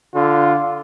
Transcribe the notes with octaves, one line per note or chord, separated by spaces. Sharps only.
D3 F4